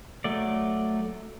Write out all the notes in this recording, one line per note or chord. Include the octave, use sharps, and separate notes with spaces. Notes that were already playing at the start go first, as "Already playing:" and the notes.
F#3 A3 D5